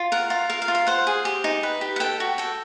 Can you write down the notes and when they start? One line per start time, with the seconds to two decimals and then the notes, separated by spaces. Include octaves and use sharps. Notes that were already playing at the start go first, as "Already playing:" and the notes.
Already playing: F4
0.12 A#4 F#5
0.30 F4
0.50 A#4 F5
0.62 F5
0.68 F4
0.75 F5
0.87 C5 F#5
1.07 G#4
1.25 G4
1.44 D#4
1.63 B4
1.81 G4
1.96 F#5
2.00 A4 G5
2.20 F#4
2.38 A4 G5